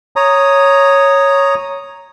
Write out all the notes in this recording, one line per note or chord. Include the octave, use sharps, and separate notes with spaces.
C#5 A#5 D#6